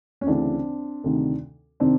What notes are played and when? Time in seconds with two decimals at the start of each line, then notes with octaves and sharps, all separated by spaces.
0.21 C#4
0.27 D2 C#3 E3 C4 D4
1.04 D2 C3 D#3
1.80 C3 D#3 C4 D4